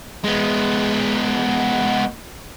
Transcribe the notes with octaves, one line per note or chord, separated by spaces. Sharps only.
G#3 B3